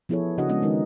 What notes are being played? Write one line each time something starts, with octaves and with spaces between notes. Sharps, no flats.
F3 B3 E4 G#4 A4 C#5
C#3 D4 F#4 D#5 F#5
G#3 B3 C#4 D#5
D#3 G#3 D#4 A#4